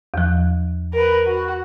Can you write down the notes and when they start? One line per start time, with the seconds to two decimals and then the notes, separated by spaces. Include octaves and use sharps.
0.14 E2 F3
0.93 A#4 B4
1.27 F#4